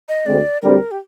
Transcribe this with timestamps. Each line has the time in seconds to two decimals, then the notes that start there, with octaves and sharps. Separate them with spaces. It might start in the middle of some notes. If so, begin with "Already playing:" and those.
0.09 D#5
0.26 D2 D3 G#3 C4 D5
0.62 D2 D3 G3 C4 A#4
0.91 G4